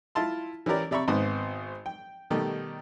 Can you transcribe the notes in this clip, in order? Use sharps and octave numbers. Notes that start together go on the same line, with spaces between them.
E4 F4 A5 C6
E3 C#4 E4 G4 A#4 D5
C3 D5 E5 A#5 B5 C#6
G#1 G#2 B3 C4 C5 D#6
G5
B2 D#3 G3 A3 G4